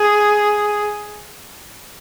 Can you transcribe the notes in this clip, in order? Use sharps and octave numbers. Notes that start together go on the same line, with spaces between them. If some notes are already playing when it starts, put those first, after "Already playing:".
Already playing: G#4